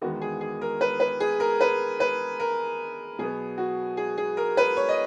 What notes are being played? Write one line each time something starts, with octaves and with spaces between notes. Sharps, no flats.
E2 D#3 G#3 B3 F#4
G#4
G#4
A#4
B4
B4
G#4
A#4
B4
B4
A#4
B2 F#3 B3 G#4
F#4
G#4
G#4
A#4
B4
C#5
D#5